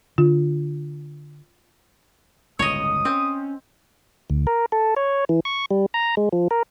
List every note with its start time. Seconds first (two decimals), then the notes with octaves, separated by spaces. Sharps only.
0.18 D3 F4
2.59 G1 C#2 A2 C#5 D#5 D#6
3.05 C4 C#4
4.30 D2
4.47 A#4
4.72 A4
4.97 C#5
5.29 E3
5.45 C#6
5.71 G3
5.94 A#5
6.17 G#3
6.33 F3
6.51 A#4